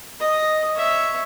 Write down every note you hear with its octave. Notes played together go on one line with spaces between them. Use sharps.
D#5
C#5 E5